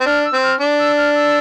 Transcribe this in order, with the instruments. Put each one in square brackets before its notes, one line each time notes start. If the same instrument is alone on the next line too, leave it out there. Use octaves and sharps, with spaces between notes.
[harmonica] C4
[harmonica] D4 [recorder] F6
[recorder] E6
[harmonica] C4
[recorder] F6
[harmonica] D4 [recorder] D6
[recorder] E6
F6
E6